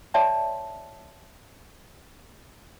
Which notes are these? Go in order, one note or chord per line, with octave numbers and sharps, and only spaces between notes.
C#5 D5 E5 G5 A5 C6